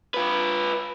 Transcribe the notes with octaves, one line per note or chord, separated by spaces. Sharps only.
F4 B4